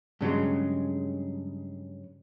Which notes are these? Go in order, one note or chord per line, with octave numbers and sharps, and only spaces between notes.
G2 C#3 F#3 G#3